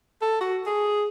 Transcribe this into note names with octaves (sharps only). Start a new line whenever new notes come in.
A4
F#4
G#4